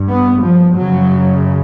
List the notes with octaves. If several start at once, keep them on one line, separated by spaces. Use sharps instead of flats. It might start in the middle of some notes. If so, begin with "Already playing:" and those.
Already playing: G2
B3
F3
F#2 C#3 F#3